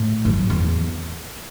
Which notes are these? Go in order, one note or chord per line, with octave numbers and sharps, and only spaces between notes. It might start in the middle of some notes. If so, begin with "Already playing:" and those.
Already playing: A2
F#2
E2